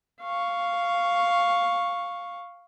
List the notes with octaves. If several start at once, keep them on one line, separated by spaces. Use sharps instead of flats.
F5 C#6